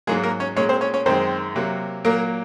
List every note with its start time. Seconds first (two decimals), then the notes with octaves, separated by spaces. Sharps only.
0.07 G#2 F#3 G#3 A#3 G#4
0.23 A#3 A#4
0.40 C#4 C#5
0.56 A#2 G#3 C#4 C#5
0.69 C4 C5
0.81 C#4 C#5
0.94 C#4 C#5
1.06 F#2 D#3 G#3 C4 C5
1.55 C3 F#3 A#3
2.05 A#2 F#3 A#3 A#4